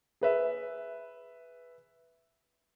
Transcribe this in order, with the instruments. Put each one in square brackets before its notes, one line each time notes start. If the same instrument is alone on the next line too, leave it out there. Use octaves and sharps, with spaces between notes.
[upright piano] G#4 B4 E5